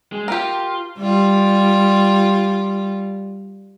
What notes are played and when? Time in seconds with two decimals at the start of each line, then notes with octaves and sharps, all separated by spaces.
0.12 G#3
0.28 F4 G4 A#4
0.99 G3 F4